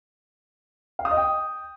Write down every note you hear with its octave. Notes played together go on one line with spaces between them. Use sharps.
F5
D#6
D#5
G5